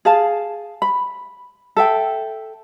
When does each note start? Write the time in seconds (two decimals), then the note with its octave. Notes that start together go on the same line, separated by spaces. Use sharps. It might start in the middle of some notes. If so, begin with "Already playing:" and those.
0.05 G#4 F5 A5
0.82 B5
1.77 A4 E5 G5